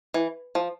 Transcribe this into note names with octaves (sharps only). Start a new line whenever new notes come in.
E3
F3